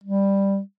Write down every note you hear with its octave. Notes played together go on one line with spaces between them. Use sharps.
G3